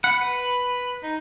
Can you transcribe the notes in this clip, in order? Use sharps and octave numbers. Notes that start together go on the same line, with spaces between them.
F#5 B5
B4
D#4